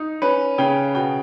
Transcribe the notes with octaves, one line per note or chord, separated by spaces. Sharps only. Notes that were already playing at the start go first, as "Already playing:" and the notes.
Already playing: D#4
C#4 B4
C#3 G5
B2 G5